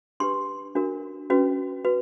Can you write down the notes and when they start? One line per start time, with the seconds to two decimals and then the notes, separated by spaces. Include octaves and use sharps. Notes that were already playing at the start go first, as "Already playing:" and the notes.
0.20 D4 G4 B4 C6
0.75 D4 F#4 A#4
1.30 C#4 F#4 B4
1.84 F#4 B4